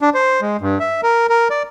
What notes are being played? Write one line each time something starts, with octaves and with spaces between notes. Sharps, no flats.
D4
C5
G#3
G2
E5
A#4
A#4
D5